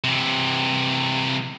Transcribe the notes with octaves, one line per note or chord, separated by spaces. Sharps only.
C3 E3